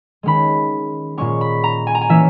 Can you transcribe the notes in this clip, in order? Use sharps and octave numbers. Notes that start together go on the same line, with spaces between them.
D#3 G#3 C#4 B5
A#2 G#3 C#4 C#6
B5
A#5
G#5
A#5
G#5
E3 A#3 C#4 E5